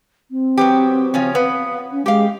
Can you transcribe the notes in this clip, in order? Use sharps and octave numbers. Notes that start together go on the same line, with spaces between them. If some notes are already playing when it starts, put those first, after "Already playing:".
C4
F#3 B3 G4
C#3 F3 C#4
B3 F5
C#4
G#3 G4 F5